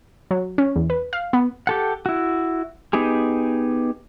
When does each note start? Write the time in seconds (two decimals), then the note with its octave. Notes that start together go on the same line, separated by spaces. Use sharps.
0.31 F#3
0.58 C#4
0.76 E2
0.90 B4
1.13 F5
1.33 B3
1.67 G4 A4 F#5
2.06 E4 F#4
2.93 B3 D#4 G4 G#4